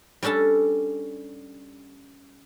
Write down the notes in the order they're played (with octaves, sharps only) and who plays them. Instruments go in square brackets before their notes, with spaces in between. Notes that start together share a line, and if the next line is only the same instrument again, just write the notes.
[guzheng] G3 C#4 D4 A4 A5